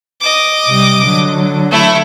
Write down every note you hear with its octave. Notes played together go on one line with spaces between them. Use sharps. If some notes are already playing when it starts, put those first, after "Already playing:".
D#5 D6
C3 G3
D3 F#3
A3 E4